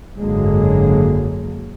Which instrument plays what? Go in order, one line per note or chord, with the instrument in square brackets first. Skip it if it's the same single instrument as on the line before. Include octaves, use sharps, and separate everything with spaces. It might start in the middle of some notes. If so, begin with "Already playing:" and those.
[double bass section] G#1 F#2 D3 F#3 G#3 A#3